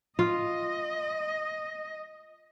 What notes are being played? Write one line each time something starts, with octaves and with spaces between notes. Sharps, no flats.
F4 D#5